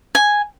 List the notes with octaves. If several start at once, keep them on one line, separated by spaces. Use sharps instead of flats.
G#5